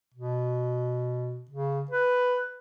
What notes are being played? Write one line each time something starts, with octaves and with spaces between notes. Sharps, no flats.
B2
C#3
B4